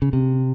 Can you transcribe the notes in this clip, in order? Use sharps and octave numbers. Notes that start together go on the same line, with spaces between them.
C#3
C3